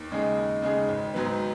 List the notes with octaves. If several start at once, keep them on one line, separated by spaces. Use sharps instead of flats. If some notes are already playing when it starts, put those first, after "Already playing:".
Already playing: D#2
C#3 G#3 D#4 G#4
D#2
C#3 G#3 D#4 G#4
G#1
G#2 F#3 B3